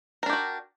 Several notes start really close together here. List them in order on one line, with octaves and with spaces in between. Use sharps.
A#4 D4 G4 F#4